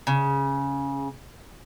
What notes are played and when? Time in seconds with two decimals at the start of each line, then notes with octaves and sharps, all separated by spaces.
0.07 C#3